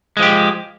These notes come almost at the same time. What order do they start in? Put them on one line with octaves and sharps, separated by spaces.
G#3 F3 G4